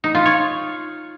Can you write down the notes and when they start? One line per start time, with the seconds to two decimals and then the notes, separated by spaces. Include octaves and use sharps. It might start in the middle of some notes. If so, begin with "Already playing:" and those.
0.04 D#4
0.15 F4
0.25 C#5